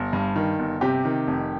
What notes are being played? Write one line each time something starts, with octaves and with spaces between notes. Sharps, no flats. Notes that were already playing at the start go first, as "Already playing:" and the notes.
Already playing: G1
G2
D#3
G1
C3 G4
D#3
F1